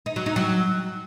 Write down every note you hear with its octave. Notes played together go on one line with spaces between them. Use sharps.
D#4
F#3
D#4
F#3